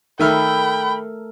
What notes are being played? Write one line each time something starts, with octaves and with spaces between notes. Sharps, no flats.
D#3 A3 A4 A#4 E5 G5 B5 F6